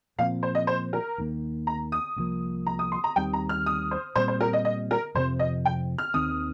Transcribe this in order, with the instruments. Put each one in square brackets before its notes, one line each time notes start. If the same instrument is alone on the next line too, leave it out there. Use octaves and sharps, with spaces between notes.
[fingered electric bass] A#2 F3 C4 [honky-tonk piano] F5
[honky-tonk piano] C5
D#5
C5
A#4
[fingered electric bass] D#2 D#3 A#3
[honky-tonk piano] A#5
D#6
[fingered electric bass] C2 C3 F3 A#3
[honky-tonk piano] A#5
D#6
C6
A#5
[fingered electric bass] D#2 D#3 G3 C4 [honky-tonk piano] G5
[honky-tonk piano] A#5
F6
D#6
C5
[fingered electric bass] A#2 G3 C4 [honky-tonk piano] C5
[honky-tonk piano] C5
A#4
D#5
D#5
A#4
[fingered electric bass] F2 C3 F3 C4 [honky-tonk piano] C5
[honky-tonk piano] D#5
G5
F6
[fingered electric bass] D#2 D#3 C4 [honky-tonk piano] D#6